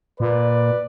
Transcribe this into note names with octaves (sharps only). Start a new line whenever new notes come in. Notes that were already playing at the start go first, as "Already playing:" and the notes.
A#2 B4 D5